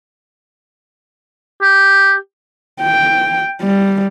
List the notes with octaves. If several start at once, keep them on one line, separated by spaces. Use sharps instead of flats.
G4
G5
G3